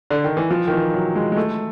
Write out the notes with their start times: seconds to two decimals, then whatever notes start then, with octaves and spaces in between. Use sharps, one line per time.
0.11 D3
0.24 D#3
0.37 E3
0.51 F3
0.68 D#3
0.72 E3
0.94 F#3
1.15 G#3
1.32 G#3
1.37 A3